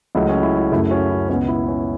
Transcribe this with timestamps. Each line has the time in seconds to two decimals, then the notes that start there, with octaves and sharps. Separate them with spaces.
0.15 C#2 C#3 F#3 A3 E4
0.29 C#4
0.43 E4
0.58 E4
0.72 F#2 C#3 A3 E4 A4
0.91 C#4 F#4
1.10 E4
1.29 C#2 B2 B3 C#4
1.48 E4
1.67 C#4